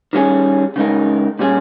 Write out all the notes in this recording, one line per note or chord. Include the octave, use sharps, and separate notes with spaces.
D#3 G3 C#4 G#4
C#3 G#3 D#4 A#4
A#2 G3 C#4 G#4